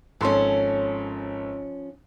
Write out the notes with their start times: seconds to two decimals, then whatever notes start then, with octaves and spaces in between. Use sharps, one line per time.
0.21 G#1 F3 C#4 A4 C6